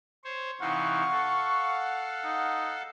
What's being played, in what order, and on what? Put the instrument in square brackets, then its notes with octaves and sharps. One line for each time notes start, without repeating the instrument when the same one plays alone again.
[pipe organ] C5 C#5
[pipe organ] C3 E3 D#4 [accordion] F5 F#5 [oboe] C#6
[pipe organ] A4
[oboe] D#4